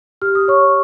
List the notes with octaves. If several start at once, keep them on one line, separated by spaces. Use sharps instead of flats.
G4 F6
D#6
C#5 C#6